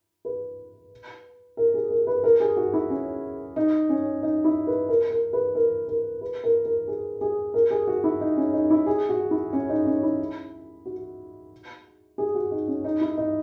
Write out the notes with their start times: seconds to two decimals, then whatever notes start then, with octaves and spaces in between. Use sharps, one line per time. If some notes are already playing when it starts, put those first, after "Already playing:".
0.25 B4
1.57 A#4
1.74 G#4
1.91 A#4
2.07 B4
2.24 A#4
2.40 G#4
2.57 F#4
2.73 E4
2.90 C#4
3.56 D#4
3.89 C#4
4.23 D#4
4.44 E4
4.67 B4
4.89 A#4
5.11 A#4
5.33 B4
5.55 A#4
5.88 A#4
6.21 B4
6.44 A#4
6.65 A#4
6.88 G#4
7.21 G#4
7.54 A#4
7.71 G#4
7.87 F#4
8.04 E4
8.21 D#4
8.37 C#4
8.54 D#4
8.70 E4
8.86 G#4
9.09 F#4
9.31 E4
9.53 C#4
9.69 D#4
9.86 C#4
10.03 E4
10.85 F#4
12.18 G#4
12.35 F#4
12.51 D#4
12.68 C#4
12.84 D#4
13.01 E4
13.17 D#4